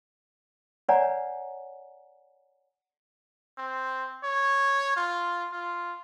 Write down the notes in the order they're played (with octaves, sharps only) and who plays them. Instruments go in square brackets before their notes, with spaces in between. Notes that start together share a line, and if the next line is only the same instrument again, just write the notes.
[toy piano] B4 C#5 D5 F#5 G#5 A#5
[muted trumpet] C4
C#5
F4
F4